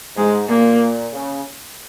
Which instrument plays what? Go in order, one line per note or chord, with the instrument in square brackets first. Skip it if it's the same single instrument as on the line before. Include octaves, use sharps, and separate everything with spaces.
[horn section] G#2 [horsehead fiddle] G#3
[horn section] A#2 [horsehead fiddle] A#3
[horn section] C#3